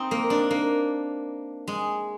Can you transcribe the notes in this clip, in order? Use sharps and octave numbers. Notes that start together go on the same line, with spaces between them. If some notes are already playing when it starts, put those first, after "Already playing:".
Already playing: C4 D#4
A#3
D4
A#3
G#3